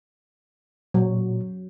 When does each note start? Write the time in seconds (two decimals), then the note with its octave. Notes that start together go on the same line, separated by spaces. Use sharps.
0.94 A#2 F#3